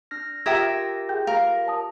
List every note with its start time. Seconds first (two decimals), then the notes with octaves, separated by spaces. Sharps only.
0.11 D4 F6 A#6
0.46 F4 G4 A#4 E5 G5 D#6 G#6 A#6
1.09 G#4 G5 G6
1.27 A#4 F5
1.67 C#5 A5 D#6